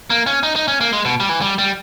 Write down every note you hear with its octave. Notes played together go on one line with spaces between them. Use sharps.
A#3
C#4
D#4
D#4
C#4
A#3
G#3
B2
G3
E3
G3
G3